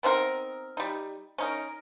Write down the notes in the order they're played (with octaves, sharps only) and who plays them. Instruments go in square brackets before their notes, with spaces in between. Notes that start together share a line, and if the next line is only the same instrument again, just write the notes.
[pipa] B3 C4 D#4 A#4
G3 D#4
C#4 D#4 A#4